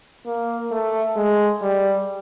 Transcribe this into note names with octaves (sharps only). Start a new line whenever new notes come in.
A#3
A3
G#3
G3